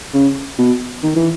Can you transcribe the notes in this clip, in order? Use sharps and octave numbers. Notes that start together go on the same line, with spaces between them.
C#3
B2
D#3
E3